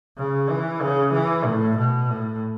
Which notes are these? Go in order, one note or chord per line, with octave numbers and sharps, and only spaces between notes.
C#3
E3
C#3
E3
A2
B2
A2